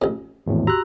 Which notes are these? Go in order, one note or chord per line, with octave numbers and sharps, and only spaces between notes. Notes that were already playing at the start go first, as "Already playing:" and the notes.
A1 F2
G#1 E2 A2
F#4 G4 A#5 E6 F#6